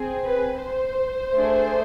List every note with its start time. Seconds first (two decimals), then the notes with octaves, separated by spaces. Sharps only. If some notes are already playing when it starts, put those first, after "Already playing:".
Already playing: C4 G#4
0.25 B4
0.61 C5
1.32 A3 D4 G#4